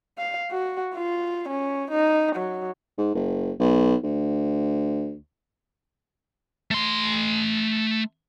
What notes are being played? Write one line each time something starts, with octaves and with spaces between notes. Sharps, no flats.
F5
F#4
F4
C#4
D#4
F#3
G#2
F#1
B1
D2
A3 C6